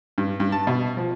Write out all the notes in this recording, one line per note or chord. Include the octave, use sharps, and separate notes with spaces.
G2
G2
A5
B2
F3